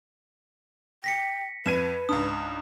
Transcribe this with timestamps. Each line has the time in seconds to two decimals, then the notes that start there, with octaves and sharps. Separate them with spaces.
1.04 G5 A#6 B6 C#7
1.66 F2 B4 G#6 D#7 E7
2.09 C#2 G#2 D4 D#6